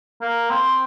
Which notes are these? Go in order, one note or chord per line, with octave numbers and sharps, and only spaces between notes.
A#3
C4